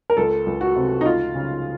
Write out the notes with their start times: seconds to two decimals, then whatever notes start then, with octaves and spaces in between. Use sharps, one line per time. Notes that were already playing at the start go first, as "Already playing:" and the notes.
0.10 A#4
0.17 C#2 A4
0.46 C#2
0.61 F#4
0.76 C3
1.01 D#4
1.05 C#2 F4
1.35 C#3